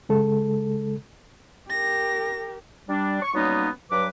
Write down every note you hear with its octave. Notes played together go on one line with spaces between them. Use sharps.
C#3 G#3 A4
G4 A#4 A#6
G3 D4
C#6
F#3 G3 A#3 B3 C#4 D#4
G2 F#3 B4 D6